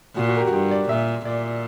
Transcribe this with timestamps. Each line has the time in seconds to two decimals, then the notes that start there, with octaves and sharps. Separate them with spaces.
0.16 A#2 F#4
0.28 F#4
0.37 A#4
0.40 G4
0.47 F#4
0.53 G2 G4
0.71 D5
0.89 A#2 E5
1.25 A#2 D5